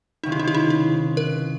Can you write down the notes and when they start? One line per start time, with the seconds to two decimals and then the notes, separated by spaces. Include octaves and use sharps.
0.23 C#2 C3 D#3 F#3 D#4
0.32 E4
0.39 D#4
0.48 E4
0.54 D#4
0.70 E4
1.17 A#4